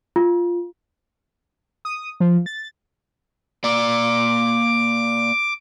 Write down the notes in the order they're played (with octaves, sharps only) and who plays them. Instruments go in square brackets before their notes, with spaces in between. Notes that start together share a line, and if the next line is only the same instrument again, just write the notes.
[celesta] F4
[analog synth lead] D#6
F3
A6
[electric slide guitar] A#3 D5 [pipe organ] D6